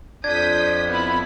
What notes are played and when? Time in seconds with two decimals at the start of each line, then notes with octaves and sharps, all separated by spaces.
0.24 F2 D4 D#6 G6 G#6 B6
0.89 B3 E4 B5